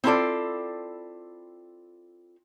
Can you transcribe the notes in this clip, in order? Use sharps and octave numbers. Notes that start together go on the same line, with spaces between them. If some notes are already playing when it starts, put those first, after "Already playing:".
C4 E4 F4 A4 D5